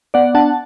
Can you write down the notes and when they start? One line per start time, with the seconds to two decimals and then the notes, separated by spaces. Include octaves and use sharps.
0.14 B3 D5 F#5
0.35 D4 F#5 A5